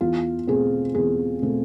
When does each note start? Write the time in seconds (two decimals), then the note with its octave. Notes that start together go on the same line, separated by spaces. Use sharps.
0.01 E2 F4
0.47 B2 A3 C4 G#4
0.95 E2 G#4
1.42 B2 A3 C4